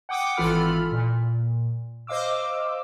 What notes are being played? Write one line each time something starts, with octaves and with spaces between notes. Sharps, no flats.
F#5 G5 D6 D#6
G#1 E3 F4 A4 B5 F6
A#2
C5 D#5 F5 D6 E6